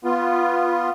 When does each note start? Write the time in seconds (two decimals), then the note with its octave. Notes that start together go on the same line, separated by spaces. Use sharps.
0.04 B3 F4